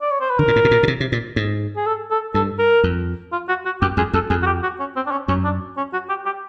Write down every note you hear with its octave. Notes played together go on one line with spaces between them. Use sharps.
D5
C#5
C5
B4
D3 A#4
A#2
A2
B2
A#2
B2
C3
C3
A#2
G#2
G#4
A4
A4
G2 A4
A#4
F2
F4
F#4
F#4
F#2 G4
F2 G#4
F2 A4
F2 G#4
F#4
G4
F#4
C#4
C4
D4
C#4
F#2 C#4
D4
C#4
F#4
G4
G4